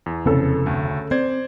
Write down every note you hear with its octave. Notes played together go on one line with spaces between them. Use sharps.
E2
F1 C#3 B3 C4 A4
D2 A3
C4 C5 D5 G#6